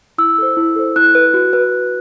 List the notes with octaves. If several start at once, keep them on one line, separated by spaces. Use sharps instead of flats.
E4 E6
A4 C5
E4
A4 C5
E4 F#6
B4
F#4
B4